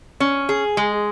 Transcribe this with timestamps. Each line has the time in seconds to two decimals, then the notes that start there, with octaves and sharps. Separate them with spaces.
0.20 C#4
0.49 G#4
0.77 G#3